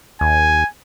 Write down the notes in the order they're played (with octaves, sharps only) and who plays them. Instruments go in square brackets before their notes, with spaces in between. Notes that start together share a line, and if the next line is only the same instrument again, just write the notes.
[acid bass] D#2 [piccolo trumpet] G#5